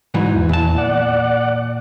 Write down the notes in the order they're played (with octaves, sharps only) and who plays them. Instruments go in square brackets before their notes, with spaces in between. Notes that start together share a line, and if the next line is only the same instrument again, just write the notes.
[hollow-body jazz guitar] G#2 E3 F#3
[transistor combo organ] E2
[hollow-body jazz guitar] A#2 A5
[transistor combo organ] D5 F#5